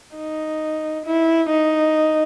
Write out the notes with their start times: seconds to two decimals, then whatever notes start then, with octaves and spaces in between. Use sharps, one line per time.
0.16 D#4
1.05 E4
1.50 D#4